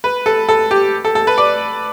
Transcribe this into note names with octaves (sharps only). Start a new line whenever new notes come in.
B4
A4
A4
G4
A4
A4
B4
D5